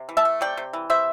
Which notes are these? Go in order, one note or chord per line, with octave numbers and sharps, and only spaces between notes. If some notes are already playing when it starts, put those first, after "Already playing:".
Already playing: C3
E3
E5 A5
A3
C3 D5 G5
C3
E3
C3 C5 E5